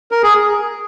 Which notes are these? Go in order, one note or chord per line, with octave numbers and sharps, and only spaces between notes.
A#4
G#4